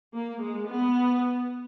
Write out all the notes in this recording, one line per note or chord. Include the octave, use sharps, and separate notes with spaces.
A#3
G#3
B3